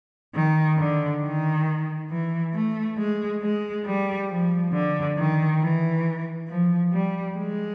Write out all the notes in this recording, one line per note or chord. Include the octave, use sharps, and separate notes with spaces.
D#3
D3
D#3
E3
A3
G#3
G#3
G3
F3
D3
D#3
E3
F3
G3
G#3